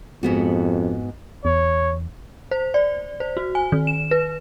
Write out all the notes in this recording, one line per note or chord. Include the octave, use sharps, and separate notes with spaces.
F2 G#2 B3 F#4
E2 C#5
C5
D5
C5
F#4
G#5
D#3
E7
B4